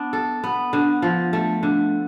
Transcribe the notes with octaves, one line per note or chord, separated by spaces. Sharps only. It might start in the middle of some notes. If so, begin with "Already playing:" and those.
Already playing: B3 D4
A4
B3
D3
F3
A3
D3